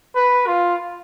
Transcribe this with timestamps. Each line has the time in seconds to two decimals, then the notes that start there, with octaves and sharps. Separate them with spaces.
0.16 B4
0.47 F4